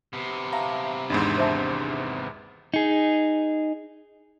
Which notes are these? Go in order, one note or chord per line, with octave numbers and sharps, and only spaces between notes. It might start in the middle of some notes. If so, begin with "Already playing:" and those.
C3 B3
E5 F5 A5 A#5
G#1 E2 G#2 D4 B5 C6
C5 E5 A5
D#4 G#4